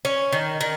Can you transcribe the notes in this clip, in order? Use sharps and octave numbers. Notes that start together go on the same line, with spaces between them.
C#4
D#3
D#3